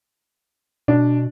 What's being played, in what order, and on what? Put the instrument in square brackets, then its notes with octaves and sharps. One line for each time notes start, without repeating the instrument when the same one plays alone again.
[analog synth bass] B2 [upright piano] D4